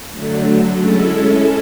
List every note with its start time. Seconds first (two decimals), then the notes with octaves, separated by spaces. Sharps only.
0.12 D3 F#3 A3
0.79 G#3 C#4 E4 A4